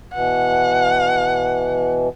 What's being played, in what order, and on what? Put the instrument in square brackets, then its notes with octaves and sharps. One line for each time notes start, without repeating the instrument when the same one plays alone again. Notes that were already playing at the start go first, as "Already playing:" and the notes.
[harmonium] B2 E3 [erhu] F#5